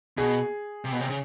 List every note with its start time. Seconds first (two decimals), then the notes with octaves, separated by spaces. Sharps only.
0.18 B2 G#4
0.85 C3
0.92 B2
1.00 C3
1.10 C#3